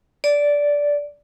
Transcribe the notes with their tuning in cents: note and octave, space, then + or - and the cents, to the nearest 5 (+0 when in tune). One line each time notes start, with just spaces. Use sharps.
D5 -10